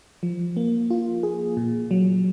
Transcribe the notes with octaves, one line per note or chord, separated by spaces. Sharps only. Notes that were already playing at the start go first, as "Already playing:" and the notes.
F3
A#3
F4
G#4
A#2
F#3